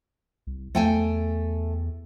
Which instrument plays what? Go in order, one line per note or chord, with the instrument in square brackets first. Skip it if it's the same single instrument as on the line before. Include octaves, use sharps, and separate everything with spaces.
[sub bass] C2
[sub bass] E2 [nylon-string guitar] A3 G5 G#5